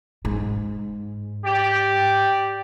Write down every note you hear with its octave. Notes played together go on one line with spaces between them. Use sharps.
G#2
G4 D5